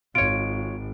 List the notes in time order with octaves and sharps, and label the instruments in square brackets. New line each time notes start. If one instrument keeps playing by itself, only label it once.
[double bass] G#1 [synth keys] F4 C#5 [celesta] D7